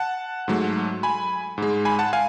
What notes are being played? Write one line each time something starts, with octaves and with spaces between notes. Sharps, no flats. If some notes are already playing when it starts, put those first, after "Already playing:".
Already playing: F#5 A5
G#2 F#3 A3
G#5 B5
G#2 G#3
G#5 B5
F#5 A5
F5 G#5